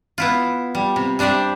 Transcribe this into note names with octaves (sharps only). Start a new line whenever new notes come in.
B3 E4 F4
G3
C3
G3 D4 C5 D5 E5